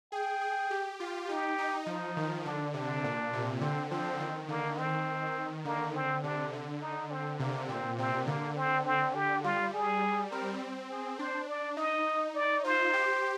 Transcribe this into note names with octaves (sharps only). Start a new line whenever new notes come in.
G#4 G5
G#4
G4
F4
D#4 G4
D#4
F3 D#4
D#3
D3 D4
C3 D4
A#2
C3
D3 C4
F3 C4
D#3
D3 A#3
D#3 C4
D3 A#3
C4
C3 D4
D3
D#4
C4
C3 A#3
A#2 C4
C3 C4
D3 A#3
C4
C4
G4
G3 F4
G#4
C4 A#4
G#4
D4 C5
D5
D#4 D#5
D5
F4 C5
G4